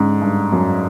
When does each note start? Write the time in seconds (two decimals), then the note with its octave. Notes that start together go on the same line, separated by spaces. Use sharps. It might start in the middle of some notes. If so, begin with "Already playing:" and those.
Already playing: G#2 D3 C#4
0.22 G2
0.52 F#2